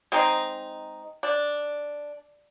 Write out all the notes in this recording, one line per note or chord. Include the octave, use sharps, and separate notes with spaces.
G#3 C4 D#4
D4